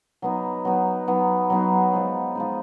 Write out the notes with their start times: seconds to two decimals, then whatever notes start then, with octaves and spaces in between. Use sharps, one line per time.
0.22 F#3 B3 D#4
0.65 F#3 B3 D#4
1.07 F#3 B3 D#4
1.50 F#3 B3 D#4
1.93 F3 G#3 D#4
2.35 F3 G#3 D#4